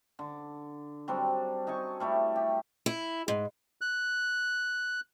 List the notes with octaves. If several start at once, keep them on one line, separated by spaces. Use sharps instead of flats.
D3
F#3 G3 C4 D4
D#4 A4 G#5 C#6
G3 A3 E4 C#5
G4
E4
G#2
F#6